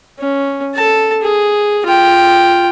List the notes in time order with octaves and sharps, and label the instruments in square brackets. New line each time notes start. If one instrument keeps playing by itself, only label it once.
[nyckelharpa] C#4
A4 A5
G#4
F4 G5